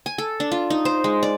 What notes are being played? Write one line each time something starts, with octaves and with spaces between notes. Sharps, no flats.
G#5
A4
D4
F4
D#4
C5
G#3
D5